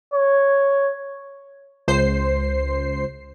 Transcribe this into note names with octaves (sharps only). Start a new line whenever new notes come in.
C#5
C#2 C5 C7